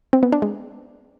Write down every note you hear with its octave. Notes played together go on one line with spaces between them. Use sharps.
C4
B3
D4
G#3